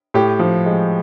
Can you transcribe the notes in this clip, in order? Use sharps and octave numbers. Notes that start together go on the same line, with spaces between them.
A2 G4
F3
G#3